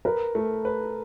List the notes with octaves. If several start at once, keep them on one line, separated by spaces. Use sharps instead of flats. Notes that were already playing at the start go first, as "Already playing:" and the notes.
A#4 B4
A3
B4